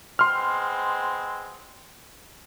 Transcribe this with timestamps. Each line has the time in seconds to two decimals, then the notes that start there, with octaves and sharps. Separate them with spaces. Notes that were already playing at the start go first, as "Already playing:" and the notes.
0.19 G#3 B3 C4 C6 F6